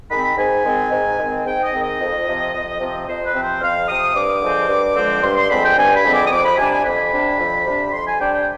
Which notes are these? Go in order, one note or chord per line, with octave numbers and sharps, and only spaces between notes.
D#3 G#3 C4 B5
G#2 G#5
D#3 G#3 C4
G#2
D#3 G#3 C4
G#2 G5
D#5
D#3 G#3 C4
D#5
F2
C3 F3 C4
F2
C3 F3 C4
F2 C5
B4
C3 F3 C4
C5
F2 F5
C3 F3 C4 D#6
G2 D6
D3 F3 G#3 C4
G2
D3 F3 G#3 C4
G2 C6
C6
D3 F3 G#3 C4 B5
G5
G2 G#5
B5
D3 F3 G#3 C4
D6
D#6
F2 D6
B5
C3 G3 D4 G#5
G#5
F2 B5
C3 G3 D4
F2
C3 G3 D4
F2 C6
G#5
C3 G3 D4 G5
G5